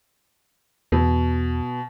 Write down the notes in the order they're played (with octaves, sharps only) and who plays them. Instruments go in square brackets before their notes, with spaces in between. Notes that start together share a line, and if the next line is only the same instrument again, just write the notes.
[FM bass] E2 [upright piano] B2